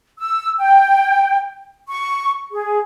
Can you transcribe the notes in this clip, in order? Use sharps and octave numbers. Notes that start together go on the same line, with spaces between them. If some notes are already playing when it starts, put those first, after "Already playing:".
E6
G5
C#6
G#4